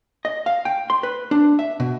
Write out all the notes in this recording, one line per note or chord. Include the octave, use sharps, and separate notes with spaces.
D#5
F5
G5
C6
B4
D4
E5
B2